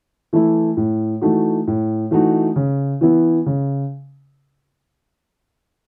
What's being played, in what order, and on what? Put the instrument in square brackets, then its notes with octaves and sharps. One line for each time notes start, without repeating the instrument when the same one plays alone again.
[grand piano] E3 A3 E4
A2
E3 A3 D#4 F#4
A2
E3 A3 D#4 F#4
C#3
E3 B3 E4
C#3